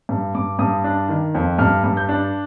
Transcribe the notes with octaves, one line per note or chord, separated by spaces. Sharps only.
G2
G2 D6
G2 D#6
D4
D#3
F2
G2 F6
G2
G6
D4